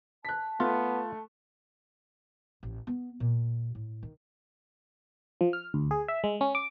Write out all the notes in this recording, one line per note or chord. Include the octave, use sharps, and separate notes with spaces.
A5 F#6 B6
A3 B3 F4
A1
B3
A#2
A2
D#3
F3
F6
D2
G#4
E5
G#3
C#4
D6